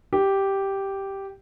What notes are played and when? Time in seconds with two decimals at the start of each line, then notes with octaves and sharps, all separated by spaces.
0.13 G4